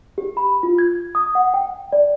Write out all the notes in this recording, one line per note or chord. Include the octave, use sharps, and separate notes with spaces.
G4
B5
F4
G#6
D#6
F#5
G5
D5